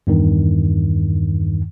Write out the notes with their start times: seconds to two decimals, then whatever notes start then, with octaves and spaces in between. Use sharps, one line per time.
0.07 E2 G2 D#3